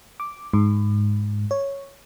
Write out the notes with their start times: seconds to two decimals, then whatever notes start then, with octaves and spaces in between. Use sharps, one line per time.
0.20 D6
0.53 G#2
1.51 C#5